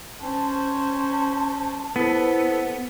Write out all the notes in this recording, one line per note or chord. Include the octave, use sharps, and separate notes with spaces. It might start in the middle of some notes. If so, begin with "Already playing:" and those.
C#4 C5 A5
B3 E4 A4 B4 C5